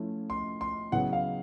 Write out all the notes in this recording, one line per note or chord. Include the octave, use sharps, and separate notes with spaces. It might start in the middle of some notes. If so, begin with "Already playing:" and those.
Already playing: F3 A3 C#4 E4
C6
C6
C#3 F#3 B3 E4 F#5
F5